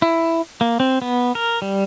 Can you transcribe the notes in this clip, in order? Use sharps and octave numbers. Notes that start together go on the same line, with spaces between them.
E4
A#3
C4
B3
A#4
G3